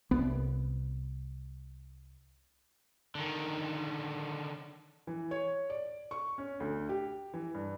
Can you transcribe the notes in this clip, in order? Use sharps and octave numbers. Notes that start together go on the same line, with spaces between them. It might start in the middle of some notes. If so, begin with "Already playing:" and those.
C2 B3
D3 D#3
E3
C#5
D5
C#6
C#4
D2
G4
E3
G2